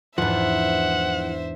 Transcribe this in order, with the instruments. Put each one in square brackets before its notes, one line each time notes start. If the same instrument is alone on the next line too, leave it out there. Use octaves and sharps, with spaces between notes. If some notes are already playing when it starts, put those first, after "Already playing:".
[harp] E2 G#2 D4 [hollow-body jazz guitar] E3 F3 [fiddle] C5 E5 [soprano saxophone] F#5